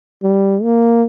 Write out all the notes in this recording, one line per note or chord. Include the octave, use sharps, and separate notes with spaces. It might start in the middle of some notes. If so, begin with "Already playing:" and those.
G3
A#3